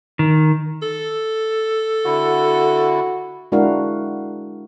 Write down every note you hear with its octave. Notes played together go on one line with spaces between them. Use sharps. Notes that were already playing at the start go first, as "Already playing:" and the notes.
D#3
A4
D3 E4 F#4
G#3 D4 E4 F#4 A#4 F5